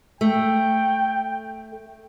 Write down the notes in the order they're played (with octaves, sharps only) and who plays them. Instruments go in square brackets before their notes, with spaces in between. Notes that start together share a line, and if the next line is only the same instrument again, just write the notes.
[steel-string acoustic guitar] A3 [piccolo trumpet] G5